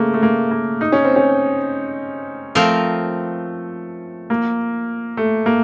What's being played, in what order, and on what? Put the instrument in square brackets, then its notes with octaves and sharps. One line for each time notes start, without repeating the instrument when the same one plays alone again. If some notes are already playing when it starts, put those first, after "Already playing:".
Already playing: [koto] C#3 [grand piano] A3 A#3
[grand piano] A3
A#3
A#3
D#4
C#4
C4
C#4
[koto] F3 C4 F4 A#4 [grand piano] A3
[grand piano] A#3
A3
A#3